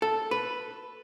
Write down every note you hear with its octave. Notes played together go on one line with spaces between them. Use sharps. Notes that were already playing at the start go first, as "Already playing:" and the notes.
A4
B4